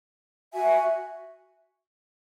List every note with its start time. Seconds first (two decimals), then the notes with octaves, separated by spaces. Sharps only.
0.53 F#4 E5 G#5